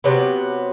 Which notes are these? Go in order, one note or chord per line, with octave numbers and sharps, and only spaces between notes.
C3 F#3 B3